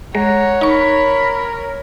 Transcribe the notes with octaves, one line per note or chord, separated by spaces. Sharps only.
G#3 C#5 F#5 A#5
D#4 A#4 B5 C#6